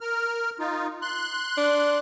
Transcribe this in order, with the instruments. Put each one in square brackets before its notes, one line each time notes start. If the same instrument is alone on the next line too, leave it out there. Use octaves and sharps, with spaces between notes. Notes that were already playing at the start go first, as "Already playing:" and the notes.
[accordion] A#4 F6
D#4 F4
C6 F#6
[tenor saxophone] D4